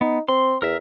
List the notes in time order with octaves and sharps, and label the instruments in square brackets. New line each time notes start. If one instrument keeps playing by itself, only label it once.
[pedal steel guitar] B3 [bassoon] D#4
[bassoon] C4 [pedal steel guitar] C6
[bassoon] E2 [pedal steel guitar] A#4 E5